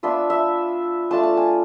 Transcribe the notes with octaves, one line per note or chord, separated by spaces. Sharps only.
B3 D4 F4 E5
E5
A3 D4 F4 A5
A5
G#5